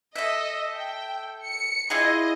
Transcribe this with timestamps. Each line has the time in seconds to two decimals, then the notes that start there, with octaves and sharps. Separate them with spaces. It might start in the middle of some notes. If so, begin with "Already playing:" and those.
0.16 A4 D#5 E5
0.75 G5
1.45 C#7
1.90 E4 F4 G#4 D#5